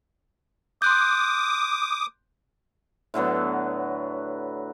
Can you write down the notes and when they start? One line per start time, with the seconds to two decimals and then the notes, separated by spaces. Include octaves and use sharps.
0.82 C6 D6 D#6 F#6 G6
3.14 A2 D3 F#3 B3